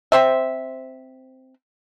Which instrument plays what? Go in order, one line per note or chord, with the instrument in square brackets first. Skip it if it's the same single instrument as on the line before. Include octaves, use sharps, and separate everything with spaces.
[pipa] C4 C5 E5